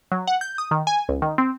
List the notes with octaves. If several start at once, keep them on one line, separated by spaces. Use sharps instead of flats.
F#3
F#5
G6
D#6
D#3
G#5
C#2
D#3
C4